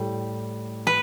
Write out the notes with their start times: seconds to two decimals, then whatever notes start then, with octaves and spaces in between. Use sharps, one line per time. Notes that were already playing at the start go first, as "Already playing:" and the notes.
Already playing: A2 G3
0.87 B4